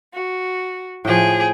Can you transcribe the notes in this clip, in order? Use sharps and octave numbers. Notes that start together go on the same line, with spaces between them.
F#4
A2 F3 G#4 G5